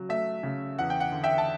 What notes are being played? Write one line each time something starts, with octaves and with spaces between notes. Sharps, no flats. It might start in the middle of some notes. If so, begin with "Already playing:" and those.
Already playing: C#3 F#3
A3 E5
C#3
E2 F#5
G5
F#5
D3
E5 G5
A5